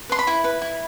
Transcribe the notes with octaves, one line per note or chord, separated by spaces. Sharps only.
B4 C6
B5
E4
B4
E4